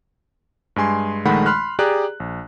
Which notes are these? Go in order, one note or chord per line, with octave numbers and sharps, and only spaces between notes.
G2 G#3 G#5 C6
A#1 D#3 G#3 A3 F#5 B5
B5 C6 F6 F#6
G4 G#4 D5 A#5 F#6
A#1